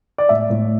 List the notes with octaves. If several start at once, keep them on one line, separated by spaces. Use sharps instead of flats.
D5
A2 E5
A2